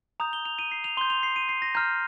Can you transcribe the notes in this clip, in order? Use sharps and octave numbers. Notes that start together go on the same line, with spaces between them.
A#5 D#6 G6 F7
G7
F7
D#7
C7
F7
C6 G6 G7
F7
C7
D#7
C7
A#6
A#5 F6 G6